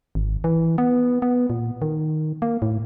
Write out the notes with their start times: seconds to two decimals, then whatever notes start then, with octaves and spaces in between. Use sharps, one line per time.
0.15 G#1
0.44 E3
0.78 B3
1.22 B3
1.50 A#2
1.82 D#3
2.42 A#3
2.62 A2